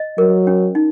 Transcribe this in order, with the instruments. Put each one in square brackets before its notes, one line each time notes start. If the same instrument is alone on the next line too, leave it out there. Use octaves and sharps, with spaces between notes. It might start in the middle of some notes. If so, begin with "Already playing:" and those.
Already playing: [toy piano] D#5
[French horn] F#3 [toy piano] A#4
[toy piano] C#4
D#4